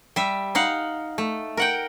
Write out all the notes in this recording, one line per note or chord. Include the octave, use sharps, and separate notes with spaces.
G3 E5
D#4 F5 F#5
A3
A#4 F#5 G5